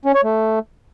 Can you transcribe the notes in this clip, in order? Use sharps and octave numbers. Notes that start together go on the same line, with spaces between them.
C#4
C#5
A3